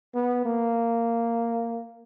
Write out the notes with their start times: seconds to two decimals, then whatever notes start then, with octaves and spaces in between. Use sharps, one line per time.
0.14 B3
0.45 A#3